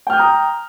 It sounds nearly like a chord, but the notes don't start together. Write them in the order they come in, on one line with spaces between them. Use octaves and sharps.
G5 F6 G6 D#6 A#5